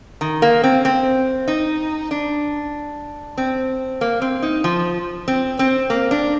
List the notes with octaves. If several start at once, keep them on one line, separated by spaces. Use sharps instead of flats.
D#3
A#3
C4
C4
D#4
D4
C4
A#3
C4
D#4
F3
C4
C4
A#3
D4